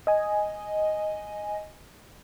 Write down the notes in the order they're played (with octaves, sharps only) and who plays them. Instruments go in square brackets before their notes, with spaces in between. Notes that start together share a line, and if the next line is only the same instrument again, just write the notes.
[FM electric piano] D#5 G#5